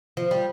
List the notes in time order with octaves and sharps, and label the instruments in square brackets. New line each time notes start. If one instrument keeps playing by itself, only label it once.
[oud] F3
G3